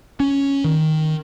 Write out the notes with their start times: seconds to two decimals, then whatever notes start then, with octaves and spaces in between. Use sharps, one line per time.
0.20 C#4
0.64 D#3